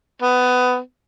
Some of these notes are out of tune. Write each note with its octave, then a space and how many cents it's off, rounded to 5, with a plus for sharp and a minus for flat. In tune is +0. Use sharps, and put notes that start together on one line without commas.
B3 +20